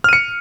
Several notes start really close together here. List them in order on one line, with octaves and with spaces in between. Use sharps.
F6 D#7 C#7